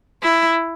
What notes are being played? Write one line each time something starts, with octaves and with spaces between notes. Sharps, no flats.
E4